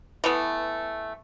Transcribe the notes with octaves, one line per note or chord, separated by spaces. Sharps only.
E3 A3 B3